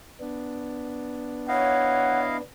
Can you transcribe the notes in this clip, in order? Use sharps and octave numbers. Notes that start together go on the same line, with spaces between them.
B3 D4
E4 C#5 D#5 F5 F#5